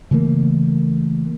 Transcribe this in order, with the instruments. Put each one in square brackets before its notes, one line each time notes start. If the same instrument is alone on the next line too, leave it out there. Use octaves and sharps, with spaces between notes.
[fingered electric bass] C#3 E3 A3 A#3